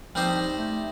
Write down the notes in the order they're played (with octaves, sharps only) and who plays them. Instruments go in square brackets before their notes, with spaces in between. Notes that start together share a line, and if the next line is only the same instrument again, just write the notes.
[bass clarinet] F3 [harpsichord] G3 C4 D#4 G4 C5
[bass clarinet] A3